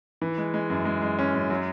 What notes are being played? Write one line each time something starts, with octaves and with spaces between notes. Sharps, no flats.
E3
G#3
G#3
F#2
G#3
G#3
C#4
F#2
F#3